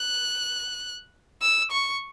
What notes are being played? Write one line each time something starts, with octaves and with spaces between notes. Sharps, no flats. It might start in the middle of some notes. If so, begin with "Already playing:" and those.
Already playing: F#6
E6
C#6